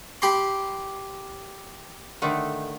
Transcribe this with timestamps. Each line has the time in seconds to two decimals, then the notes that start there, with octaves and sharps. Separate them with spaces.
0.22 G4 B5 C6
2.22 D3 D#3 A3